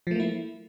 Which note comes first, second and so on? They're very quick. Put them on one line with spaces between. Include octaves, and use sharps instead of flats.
F3 A3 A#3 E4